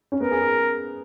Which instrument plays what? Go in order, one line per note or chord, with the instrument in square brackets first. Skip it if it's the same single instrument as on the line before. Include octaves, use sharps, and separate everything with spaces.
[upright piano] C#4
[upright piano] B3 [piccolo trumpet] A#4
[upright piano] G#4
G#4